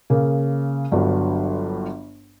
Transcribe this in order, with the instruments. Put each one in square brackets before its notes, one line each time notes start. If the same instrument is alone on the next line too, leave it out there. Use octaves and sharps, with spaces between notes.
[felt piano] C#3 A#3
G1 G2 F#3